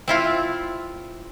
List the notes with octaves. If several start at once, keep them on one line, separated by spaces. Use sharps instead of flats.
C4 E4 F4